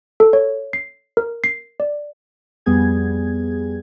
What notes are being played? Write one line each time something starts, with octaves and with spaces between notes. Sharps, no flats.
A4
C#5
C7
A#4
C7
D5
F2 G3 B3 G#4 G#6